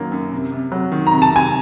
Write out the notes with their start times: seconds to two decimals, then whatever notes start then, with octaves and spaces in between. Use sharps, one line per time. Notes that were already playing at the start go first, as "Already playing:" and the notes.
Already playing: F#2 D#3 F#3 A#3
0.12 F#2
0.32 C3
0.52 C3
0.72 F#3
0.92 D#3
1.07 A#5
1.12 C3
1.22 A5
1.31 C3 G#5